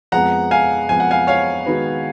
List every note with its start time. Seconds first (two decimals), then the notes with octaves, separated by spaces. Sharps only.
0.12 F2 F3 G#3 B3 F#5 A#5
0.51 F5 G#5
0.89 F2 F3 G#3 B3 G#5
1.00 F#5
1.11 F5 G#5
1.27 C#5 F5
1.66 D#3 G#3 B3 F#4 B4